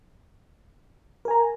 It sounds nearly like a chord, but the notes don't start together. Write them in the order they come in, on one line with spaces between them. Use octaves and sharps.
A#4 G#5 A#5